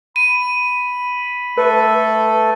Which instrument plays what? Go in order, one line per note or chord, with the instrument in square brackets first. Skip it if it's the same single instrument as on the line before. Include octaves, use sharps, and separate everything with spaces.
[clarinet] B5 [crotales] D#7
[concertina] A3 A4 [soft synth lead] B4